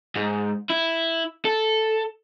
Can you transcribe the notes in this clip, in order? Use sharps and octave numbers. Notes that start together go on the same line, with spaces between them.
G#2
E4
A4